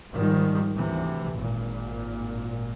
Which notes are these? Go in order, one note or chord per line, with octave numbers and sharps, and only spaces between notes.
G#2 D#3 F3 G3
D2 C3 E3
G#1 A#2